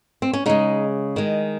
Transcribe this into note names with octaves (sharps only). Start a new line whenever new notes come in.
C4
C#4
C#3 G#3 D#4
D#3 G#3